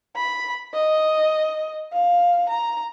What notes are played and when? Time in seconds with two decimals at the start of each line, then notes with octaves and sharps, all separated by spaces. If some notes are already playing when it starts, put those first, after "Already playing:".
0.16 B5
0.73 D#5
1.92 F5
2.49 A#5